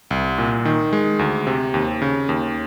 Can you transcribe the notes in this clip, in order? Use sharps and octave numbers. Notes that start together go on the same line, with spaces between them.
C2
A#2
D#3
G#3
D2
C3
D#2
C#3
D#2